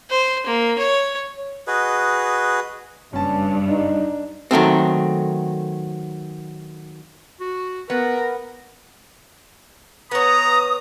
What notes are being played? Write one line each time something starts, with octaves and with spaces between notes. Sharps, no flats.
C5
A#3
C#5
F#4 G#4 B4 D#5
F#1 G2 C#4 A5
D4 D#4
D#3 F#3 A3 C4
F#4
B3 A#4 B4 F#5
B3 C#5 A#5 D#6